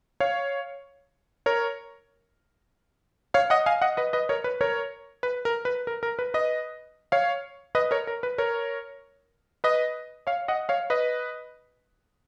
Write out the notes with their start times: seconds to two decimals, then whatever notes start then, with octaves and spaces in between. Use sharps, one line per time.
0.20 C#5 F5
1.46 A#4 C#5
3.34 C#5 F5
3.50 D#5 F#5
3.66 F5 G#5
3.82 D#5 F#5
3.97 B4 D#5
4.13 B4 D#5
4.29 A#4 C#5
4.44 B4
4.61 A#4 C#5
5.23 B4
5.45 A#4
5.65 B4
5.87 A#4
6.03 A#4
6.19 B4
6.34 B4 D#5
7.12 C#5 F5
7.75 B4 D#5
7.91 A#4 C#5
8.07 A#4
8.23 B4
8.38 A#4 C#5
9.64 B4 D#5
10.27 C#5 F5
10.48 D#5 F#5
10.69 C#5 F5
10.90 B4 D#5